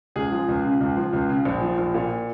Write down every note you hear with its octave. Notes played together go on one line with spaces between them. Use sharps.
C#2 G#4
F3
C#2
C#3
C#2
F3
C#2
C#3
A#1
F3
A#1
A#2